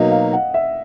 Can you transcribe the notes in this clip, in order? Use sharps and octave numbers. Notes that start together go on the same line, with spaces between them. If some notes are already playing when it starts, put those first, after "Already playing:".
Already playing: B2 F#3 A#3 D#4 D#5
F5
F#5
E5